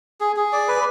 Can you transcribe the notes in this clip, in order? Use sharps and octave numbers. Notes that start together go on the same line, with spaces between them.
G#4
G#4
D5
B4